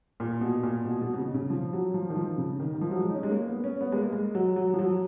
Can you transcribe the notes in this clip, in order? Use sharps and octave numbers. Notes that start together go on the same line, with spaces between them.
A#2
B2
A#2
B2
B2
B2
C#3
C#3
F3
F#3
F3
D#3
F3
C#3
D#3
D#3
F3
F#3
G#3
D#4
C#4
G#3
A#3
B3
C#4
B3
G#3
A#3
G#3
F#3
F#3
F3
F#3